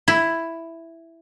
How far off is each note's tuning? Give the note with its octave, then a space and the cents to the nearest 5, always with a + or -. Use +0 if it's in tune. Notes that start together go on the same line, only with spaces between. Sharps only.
E4 +5